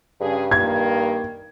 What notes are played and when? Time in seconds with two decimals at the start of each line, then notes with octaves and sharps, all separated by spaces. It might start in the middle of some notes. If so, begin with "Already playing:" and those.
0.21 G2 C#3 G#4
0.51 D#3 G3 A#3 G#6